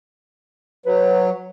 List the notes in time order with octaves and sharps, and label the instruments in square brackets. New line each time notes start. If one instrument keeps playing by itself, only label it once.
[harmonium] F#3 [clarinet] B4